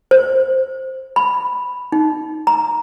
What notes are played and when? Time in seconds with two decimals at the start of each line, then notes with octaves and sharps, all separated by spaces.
0.11 C5
1.16 B5
1.92 D#4
2.47 A#5